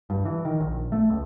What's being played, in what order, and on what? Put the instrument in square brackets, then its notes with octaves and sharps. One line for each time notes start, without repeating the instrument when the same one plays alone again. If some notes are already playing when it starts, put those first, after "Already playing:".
[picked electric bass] G2
E3
D#3
A#1
A3
C#2